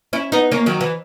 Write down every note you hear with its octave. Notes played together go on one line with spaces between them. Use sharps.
C#4 E4
B3 D#4
A#3 C#4
D#3 F#3
E3